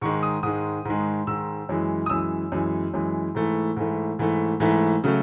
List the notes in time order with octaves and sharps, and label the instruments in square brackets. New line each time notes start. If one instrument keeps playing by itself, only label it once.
[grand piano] G#2 D#3 G#3 C#6
D#6
G#2 D#3 G#3 D#6
G#2 D#3 G#3
G#2 D#3 G#3 E6
F#2 E3 G#3
D#6
F#2 E3 G#3 E6
F#2 E3 G#3
F#2 E3 G#3
G#2 E3 A3
G#2 E3 A3
G#2 E3 A3
G#2 E3 A3
C#3 F#3 A3